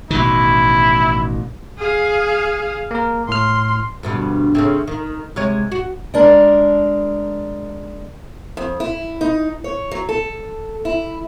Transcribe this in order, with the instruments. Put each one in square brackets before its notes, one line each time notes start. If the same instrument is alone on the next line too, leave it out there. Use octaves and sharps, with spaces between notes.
[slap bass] A1 B2 D#3 [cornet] E4
[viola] G#4 F5
[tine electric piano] A#3 A#4
[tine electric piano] A2 F6 [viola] C6
[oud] D2 G2 B2
C#3 A3 C4
D#3
C3 G#3 C#5
F#4
[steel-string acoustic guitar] G#3 D4 A#4
F2
E4
D#4
C#5
F#3
A4
E4